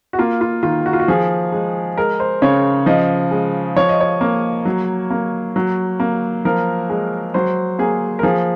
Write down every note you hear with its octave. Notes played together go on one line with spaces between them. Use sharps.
F#4
A#3 F4
F4
D#3 F4
F#4
F4
F#4
F3 G#4
G#3
G#3 A#4
C5
C#3 C#5
F3 D#5
G#3
F3 C#5
D#5
C#5
A#3
F#3
A#3
F#3
A#3
F3 A#4
G#3
F#3 C5
A#3 G#4
A#4
F3 G#4